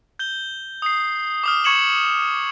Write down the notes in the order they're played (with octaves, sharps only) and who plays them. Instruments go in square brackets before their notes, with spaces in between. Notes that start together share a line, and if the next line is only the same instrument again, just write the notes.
[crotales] G6 G7
D#6 C7
D6 D#6 F6
C#6 G#6 C#7 E7 F#7